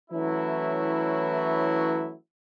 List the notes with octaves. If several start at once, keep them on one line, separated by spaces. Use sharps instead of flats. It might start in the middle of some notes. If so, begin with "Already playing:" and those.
E3 F#3 A3 C#4 E4